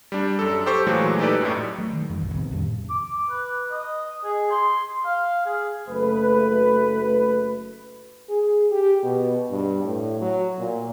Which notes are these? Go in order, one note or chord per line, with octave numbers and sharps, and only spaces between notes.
G3 D4
F#2 A4
G4 A4 C5 C#6
A#2 E3 F#3 G#3 A3
D#4 G4 A4 B4 D5
F#2 A2
F#3 A3
D#3
F2 D#3 G3
B1 E2 G#2 C3
C3 D#3 B3
F2 A2 G3 D4
D6
B4
D#5
G#4
C6
F5
G#4
F#1 A3 B4
G#4
G4
B2
G2
A2
F#3
A#2